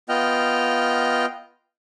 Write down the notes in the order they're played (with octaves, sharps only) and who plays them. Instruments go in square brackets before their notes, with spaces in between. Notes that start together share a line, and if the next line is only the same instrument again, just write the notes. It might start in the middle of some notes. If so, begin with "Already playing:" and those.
[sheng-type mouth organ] B3 F4 D#5 G5 F6